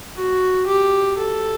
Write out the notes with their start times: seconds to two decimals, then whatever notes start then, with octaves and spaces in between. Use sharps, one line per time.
0.16 F#4
0.66 G4
1.18 A4